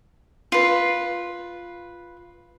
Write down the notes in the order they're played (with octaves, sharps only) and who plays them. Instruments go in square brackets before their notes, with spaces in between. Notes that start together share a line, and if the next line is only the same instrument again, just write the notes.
[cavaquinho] F4 B4